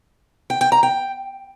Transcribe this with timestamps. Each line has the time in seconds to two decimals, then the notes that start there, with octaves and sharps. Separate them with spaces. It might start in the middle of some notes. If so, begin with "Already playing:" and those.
0.50 G5
0.61 G5
0.72 A#5
0.83 G5